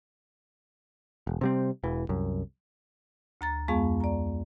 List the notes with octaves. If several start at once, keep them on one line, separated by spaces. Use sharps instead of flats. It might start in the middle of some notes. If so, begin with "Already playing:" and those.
E1
C3 G3 C4
E1 E3
C2 F#2
D2 A#5 A6
F2 G#3 B3 G#4 F5 C#6
D5 A#5